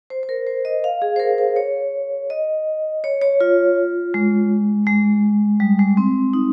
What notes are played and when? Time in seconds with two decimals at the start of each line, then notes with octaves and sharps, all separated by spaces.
0.10 C5
0.23 C5
0.29 A#4
0.47 C5
0.65 D#5
0.84 F5
1.02 G#4
1.16 C5
1.20 A#4
1.38 C5
1.56 C#5
2.30 D#5
3.04 C#5
3.22 C#5
3.41 F4
4.14 G#3
4.87 G#3
5.60 G3
5.79 G#3
5.97 C4
6.33 D#4